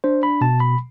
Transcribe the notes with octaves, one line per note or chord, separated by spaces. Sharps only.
D4 C5
B5
B2 A5
B5